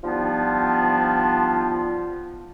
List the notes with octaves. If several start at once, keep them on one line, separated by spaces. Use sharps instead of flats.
F3 G3 B3 D4 D#4 F4